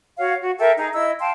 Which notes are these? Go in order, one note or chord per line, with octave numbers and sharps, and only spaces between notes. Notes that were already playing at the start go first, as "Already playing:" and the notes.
F#4 C#5 F5 F#5
F#4
A4 A#4 E5 G5
D#4 G#4 A#5
E4 D#5 E6
F5 G5 A5 C6